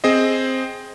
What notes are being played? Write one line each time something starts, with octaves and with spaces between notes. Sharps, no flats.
C4 G#4 C5 D#5